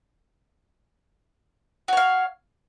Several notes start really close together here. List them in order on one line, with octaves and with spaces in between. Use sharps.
F#4 C#5 F5